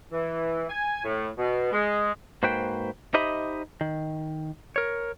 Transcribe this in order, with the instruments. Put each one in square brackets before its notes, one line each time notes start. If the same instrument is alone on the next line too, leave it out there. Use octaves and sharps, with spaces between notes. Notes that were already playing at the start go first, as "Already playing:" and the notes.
[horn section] E3
G#5
A2
B2
G#3
[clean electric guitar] G#2 A#3 F#4 B4 C5 G5
D#4 G4 C5 D#5 E5 B5
D#3
A#4 C#5